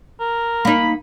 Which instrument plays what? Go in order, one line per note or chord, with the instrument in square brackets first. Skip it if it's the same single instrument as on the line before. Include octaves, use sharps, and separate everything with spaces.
[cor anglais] A#4
[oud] A#3 D#4 [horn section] B5